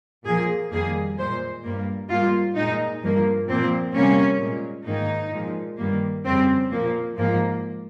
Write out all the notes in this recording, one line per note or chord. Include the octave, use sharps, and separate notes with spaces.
A#2 F3 A#3 G#4
F2 D#3 G3 A#3 G#4
A#2 G#3 C5
G2 G3 A#3
G#2 G3 A#3 F4
A#2 G#3 D#4
G2 F3 A#3
A#2 F3 A#3 C4
C3 G3 A#3 C#4
A#2 G#3
G#2 D#3 A#3 D#4
A#2 F3 G#3
G2 D#3 G3 A#3
F2 C#3 G3 C4
A#2 F3 A#3
G#2 F3 A#3